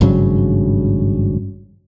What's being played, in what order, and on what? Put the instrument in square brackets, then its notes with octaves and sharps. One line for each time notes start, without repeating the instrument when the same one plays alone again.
[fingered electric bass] G#1 G2 C#3 F#3